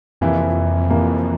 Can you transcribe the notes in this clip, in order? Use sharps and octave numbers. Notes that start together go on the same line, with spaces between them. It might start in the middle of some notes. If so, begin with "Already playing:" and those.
F2 C3 E3 A#3 E4
C3 E3 A#3 E4